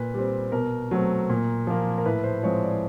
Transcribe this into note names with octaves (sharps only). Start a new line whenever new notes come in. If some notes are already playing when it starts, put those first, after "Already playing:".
Already playing: A#2 B4
G3 C4
B2 A#4
F#3 A3 C4
A#2
F3 A#3
A#4
A2 B4
C5
F3 G#3 C4 C#5
D5